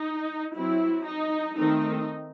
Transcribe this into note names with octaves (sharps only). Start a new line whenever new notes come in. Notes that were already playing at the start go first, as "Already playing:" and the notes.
Already playing: D#4
F#3 C4 E4
D#4
D#3 A3 C4 D#4